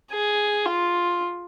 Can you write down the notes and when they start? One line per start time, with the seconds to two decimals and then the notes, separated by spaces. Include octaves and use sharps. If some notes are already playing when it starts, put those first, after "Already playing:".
0.12 G#4
0.66 F4